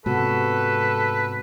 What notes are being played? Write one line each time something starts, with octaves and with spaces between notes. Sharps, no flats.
G#2 C3 G#3 B3 F#4 A4 B4